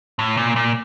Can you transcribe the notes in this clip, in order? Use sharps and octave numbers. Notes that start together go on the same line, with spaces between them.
A2
A#2
A#2